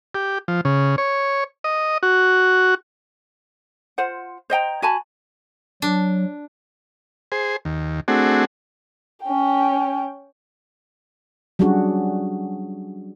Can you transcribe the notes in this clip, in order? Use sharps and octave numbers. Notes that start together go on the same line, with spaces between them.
G4
F3
C#3
C#5
D#5
F#4
F4 C5 F#5
C5 D#5 G5 A#5
F#4 G#5 A5 B5
F#3 D4
G#4 C5
D#2
A3 C4 D4 F#4 G#4
C#4 G5
F#3 G3 C#4 D4 F#4 G#4